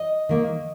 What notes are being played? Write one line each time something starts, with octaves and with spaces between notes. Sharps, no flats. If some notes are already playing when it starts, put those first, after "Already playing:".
Already playing: D#5
D#3 A#3